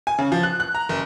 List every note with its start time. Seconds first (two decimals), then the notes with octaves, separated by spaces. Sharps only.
0.07 G#5
0.19 C#3
0.32 F3
0.43 F#6
0.60 F#6
0.75 A#5
0.89 F#1